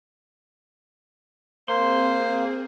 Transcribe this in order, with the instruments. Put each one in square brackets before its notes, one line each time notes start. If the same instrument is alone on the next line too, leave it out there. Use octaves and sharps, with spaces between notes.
[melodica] A#3 [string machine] C4 G#4 [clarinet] C5 [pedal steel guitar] C6